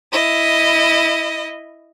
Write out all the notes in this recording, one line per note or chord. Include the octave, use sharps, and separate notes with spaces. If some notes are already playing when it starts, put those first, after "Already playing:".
E4 D#5